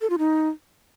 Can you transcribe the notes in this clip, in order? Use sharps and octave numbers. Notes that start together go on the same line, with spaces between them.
A4
F4
D#4